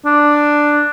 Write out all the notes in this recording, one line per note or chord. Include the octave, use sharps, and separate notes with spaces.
D4